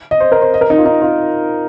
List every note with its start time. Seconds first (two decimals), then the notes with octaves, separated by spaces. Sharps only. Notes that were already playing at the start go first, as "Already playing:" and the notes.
0.11 D#5
0.20 C5
0.32 A#4
0.42 C5
0.54 D#5
0.61 A#4
0.70 D#4
0.78 F4
0.86 D#4
1.02 F4